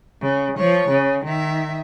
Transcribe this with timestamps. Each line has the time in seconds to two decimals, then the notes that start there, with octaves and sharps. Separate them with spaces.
0.21 C#3
0.57 F3 C#5
0.89 C#3
1.26 D#3 E5